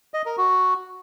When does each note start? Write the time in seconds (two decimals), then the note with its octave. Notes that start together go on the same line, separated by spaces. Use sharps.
0.14 D#5
0.26 A#4
0.38 F#4